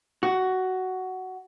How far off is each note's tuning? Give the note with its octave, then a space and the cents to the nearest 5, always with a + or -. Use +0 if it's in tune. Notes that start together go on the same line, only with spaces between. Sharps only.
F#4 +10